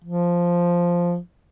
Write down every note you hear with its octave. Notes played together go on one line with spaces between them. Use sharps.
F3